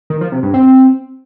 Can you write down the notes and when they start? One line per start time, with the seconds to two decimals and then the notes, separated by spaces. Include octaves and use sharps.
0.10 D#3
0.21 F3
0.32 C3
0.43 G2
0.54 C4